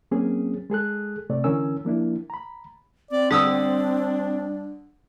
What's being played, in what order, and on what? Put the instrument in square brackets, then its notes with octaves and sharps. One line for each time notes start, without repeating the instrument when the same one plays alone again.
[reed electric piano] F#3 A#3 C4 C#4 G#4
G#3 G#4 A4 F#6
C3 A3 C4 D5
D3 E3 C#4 A#4 G#5 E6
F3 A#3 D4 E4
A#5 B5
[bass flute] C4 [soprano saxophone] D5
[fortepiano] D3 D#6 E6 [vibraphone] G3 [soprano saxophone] D4